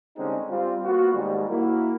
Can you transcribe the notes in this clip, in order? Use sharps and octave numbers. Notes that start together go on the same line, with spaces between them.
D3 G3 G#3 C4 C#4 D#4
G3 C4 F4
A#3 B3 F4 F#4
D#2 G#2 G3
A#3 E4 F#4